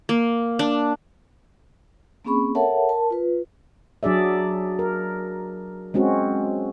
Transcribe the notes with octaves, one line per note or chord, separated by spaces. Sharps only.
A#3
D4
A#3 C4 C#4 G#4 B5 C#6
A4 A#4 C#5 E5 F#5 A5
A#4 A5
F4 B4
F#3 D4 G#4 D5 E5
A#4
G#3 C4 C#4 F#4